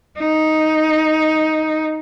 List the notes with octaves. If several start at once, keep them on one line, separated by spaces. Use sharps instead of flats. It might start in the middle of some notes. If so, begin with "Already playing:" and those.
D#4